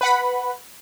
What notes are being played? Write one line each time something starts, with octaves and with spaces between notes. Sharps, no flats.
B4 F#5 B5